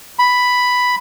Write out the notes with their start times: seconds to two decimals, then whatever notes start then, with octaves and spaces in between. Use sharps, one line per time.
0.19 B5